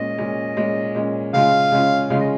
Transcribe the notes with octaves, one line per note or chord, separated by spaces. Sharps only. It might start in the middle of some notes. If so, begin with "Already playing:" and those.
Already playing: A#2 G#3 C#4 D#5
A#2 G#3 C#4
A#2 G#3 C#4
A#2 G#3 C#4
C#3 G#3 C#4 F4 F5
C#3 G#3 C#4 F4
C#3 G#3 C#4 F4 F5
D#5